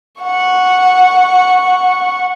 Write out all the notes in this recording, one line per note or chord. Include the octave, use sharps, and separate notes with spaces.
F#5 C#6